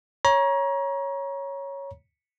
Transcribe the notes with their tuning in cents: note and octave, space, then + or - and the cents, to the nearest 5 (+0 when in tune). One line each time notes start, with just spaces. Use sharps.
C#5 +0 A#5 +30